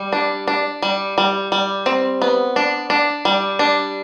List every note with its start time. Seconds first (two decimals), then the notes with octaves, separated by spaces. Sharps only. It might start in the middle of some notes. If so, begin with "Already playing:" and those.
Already playing: G3
0.13 D4
0.48 D4
0.82 G3
1.18 G3
1.52 G3
1.86 C4
2.22 B3
2.56 D4
2.90 D4
3.25 G3
3.59 D4